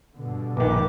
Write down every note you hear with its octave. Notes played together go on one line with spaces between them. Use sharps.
G2 B2 D3
A#1 D#3 B4 D6